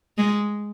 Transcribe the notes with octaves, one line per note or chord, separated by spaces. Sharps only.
G#3